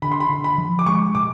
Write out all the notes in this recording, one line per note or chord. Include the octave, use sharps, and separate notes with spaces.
D3 B5
C6
B5
D3
B5
F3
D6
G#3 C#6
C3 D6